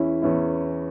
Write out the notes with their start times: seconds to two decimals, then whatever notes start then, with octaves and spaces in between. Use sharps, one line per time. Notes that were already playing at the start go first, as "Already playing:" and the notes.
Already playing: E2 E3 C#4 E4
0.22 E2 E3 C#4 E4